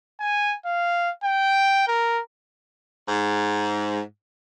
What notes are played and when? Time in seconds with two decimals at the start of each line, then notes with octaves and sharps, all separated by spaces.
0.20 G#5
0.65 F5
1.24 G5
1.87 A#4
3.08 G#2